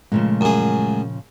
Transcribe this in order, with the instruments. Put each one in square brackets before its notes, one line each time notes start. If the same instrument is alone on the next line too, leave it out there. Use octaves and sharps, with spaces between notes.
[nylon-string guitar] A#2 C#3 F3 [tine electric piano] G#3 A3
[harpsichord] F#2 G#4